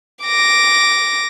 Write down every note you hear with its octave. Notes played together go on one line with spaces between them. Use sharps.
D6 A#6